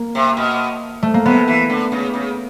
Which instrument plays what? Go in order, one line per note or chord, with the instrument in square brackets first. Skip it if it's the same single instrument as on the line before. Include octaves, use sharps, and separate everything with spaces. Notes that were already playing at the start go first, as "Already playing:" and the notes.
Already playing: [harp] A#3
[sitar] C3
B2
[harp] A3
A#3
[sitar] C3 [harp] B3
[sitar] E3
D3
C#3
C#3